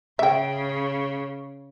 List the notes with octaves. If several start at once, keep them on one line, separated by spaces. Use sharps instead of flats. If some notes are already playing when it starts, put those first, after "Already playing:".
C#3 E5 G5